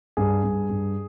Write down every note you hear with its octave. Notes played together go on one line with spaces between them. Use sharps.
G2 G#4
G2
G2